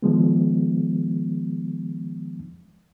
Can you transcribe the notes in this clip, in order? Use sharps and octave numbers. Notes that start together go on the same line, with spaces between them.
D#3 F3 G#3 B3